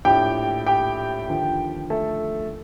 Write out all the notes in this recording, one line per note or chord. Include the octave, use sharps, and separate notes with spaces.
A#1 A2 F3 G4 G5
G4 G5
D#2 D3 F3
A3 A4